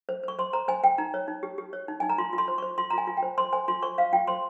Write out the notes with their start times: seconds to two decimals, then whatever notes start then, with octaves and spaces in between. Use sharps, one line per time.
0.09 C5
0.23 C5 C#6
0.39 C5 C6
0.53 C5 A#5
0.68 C5 G#5
0.84 C5 G5
0.98 D#4 A#5
1.14 C#5
1.28 D#4
1.43 G4
1.58 G4
1.73 C#5
1.88 D#4
2.00 D#4 G#5
2.10 A#5
2.18 F4 C6
2.33 F4
2.38 C6
2.48 C5
2.58 C5 C#6
2.78 F4 C6
2.90 A#5
2.93 F4 G#5
3.07 F4
3.17 G5
3.23 C5
3.38 C5 C6
3.53 C5 G#5
3.68 F4 C6
3.82 C5 C#6
3.98 C5 F5
4.13 F4 G5
4.27 C5 C6